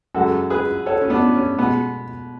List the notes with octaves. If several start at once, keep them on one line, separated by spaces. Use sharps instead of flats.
F#2 C#3 G#3 F#4 A4
G#4 B4
A4 C#5
C#4
B3 D4
C#4
B2 G#3 B3